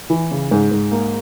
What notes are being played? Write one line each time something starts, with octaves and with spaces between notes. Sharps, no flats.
E3
C#3
G#2
G#2
A#3